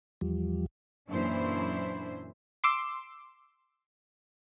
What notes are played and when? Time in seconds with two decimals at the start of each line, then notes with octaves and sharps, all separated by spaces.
0.21 E2 F3 G3
1.09 F#2 A#2 E3 D4 E4 C5
2.64 C6 D6 E6